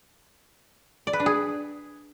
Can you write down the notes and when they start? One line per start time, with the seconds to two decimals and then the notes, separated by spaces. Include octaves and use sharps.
1.07 D5
1.13 B4
1.20 D4
1.26 G#4